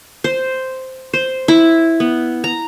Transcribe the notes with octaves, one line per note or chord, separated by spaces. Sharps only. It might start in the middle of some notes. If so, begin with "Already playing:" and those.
C5
C5
E4
B3
A#5